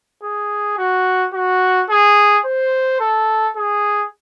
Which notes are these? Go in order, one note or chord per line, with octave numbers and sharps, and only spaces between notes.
G#4
F#4
F#4
G#4
C5
A4
G#4